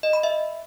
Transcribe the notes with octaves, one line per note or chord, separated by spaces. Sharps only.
D#5
B5
E5